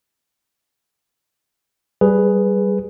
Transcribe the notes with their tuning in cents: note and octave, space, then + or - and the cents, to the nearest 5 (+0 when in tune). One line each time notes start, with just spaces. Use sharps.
G3 -10 G#4 +0 B4 +0